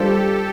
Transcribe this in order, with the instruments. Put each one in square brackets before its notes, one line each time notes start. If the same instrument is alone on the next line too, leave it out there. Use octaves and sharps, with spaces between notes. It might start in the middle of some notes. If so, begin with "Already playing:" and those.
Already playing: [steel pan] G3 D4 F4 C5 [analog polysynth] G4 A4